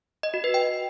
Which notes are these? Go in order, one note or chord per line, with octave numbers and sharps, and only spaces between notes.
D#5
F#4
B4
G5